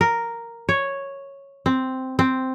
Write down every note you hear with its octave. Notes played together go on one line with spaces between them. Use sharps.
A#4
C#5
C4
C4